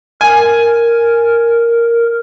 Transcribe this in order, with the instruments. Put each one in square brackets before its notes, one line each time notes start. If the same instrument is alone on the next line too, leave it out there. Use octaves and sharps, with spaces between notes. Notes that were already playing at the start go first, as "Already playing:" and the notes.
[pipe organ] A#4 [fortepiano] G#5